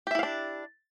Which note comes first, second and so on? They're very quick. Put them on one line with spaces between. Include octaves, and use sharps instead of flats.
G4 E5 E4 F5 D4